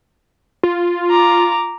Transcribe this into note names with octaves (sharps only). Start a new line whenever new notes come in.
F4
A#5 D6